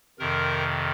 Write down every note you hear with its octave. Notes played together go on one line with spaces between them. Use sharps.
F2 C3 D#3 A#4